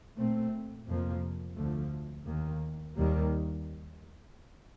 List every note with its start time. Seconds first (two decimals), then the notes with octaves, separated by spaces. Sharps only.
0.18 A#2 A3 C4
0.87 F2 C3 F3 A#3
1.56 D2 D3 F3 A3
2.26 D#2 D#3 A#3
2.96 D#2 D#3 G3 A#3